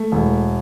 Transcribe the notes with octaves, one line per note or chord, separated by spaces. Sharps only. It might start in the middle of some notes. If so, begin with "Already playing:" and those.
Already playing: A3
E1